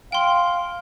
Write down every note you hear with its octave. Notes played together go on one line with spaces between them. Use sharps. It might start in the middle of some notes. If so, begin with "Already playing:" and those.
F5 G5 C6